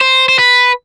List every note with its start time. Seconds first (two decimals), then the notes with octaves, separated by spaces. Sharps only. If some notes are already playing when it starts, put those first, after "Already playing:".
0.01 C5
0.29 C5
0.39 B4